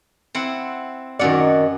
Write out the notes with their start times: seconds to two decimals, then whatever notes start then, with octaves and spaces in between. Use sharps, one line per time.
0.35 C4 E4 F#5
1.19 F#2 D#3 F#4 D5 F#5